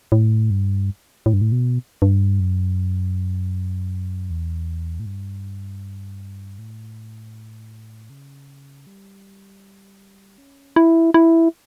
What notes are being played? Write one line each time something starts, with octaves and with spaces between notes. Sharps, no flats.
A2
G2
A2
G2
A2
B2
G2
F#2
E2
A2
G2
A2
C#3
G3
C#4
E4
E4